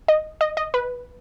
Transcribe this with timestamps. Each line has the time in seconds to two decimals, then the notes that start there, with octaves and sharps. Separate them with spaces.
0.08 D#5
0.41 D#5
0.57 D#5
0.74 B4